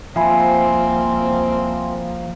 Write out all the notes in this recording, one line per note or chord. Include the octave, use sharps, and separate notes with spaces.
C2 F3 A#3 C4 E5 G#5 B5